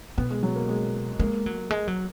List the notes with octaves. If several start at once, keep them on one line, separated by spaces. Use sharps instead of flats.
B2 B3
G#3
F#3
A#3
G#3
G#3 A#3
F#3
G#3
F#3